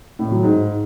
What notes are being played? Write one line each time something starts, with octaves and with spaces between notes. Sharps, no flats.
A2
F#3
G#2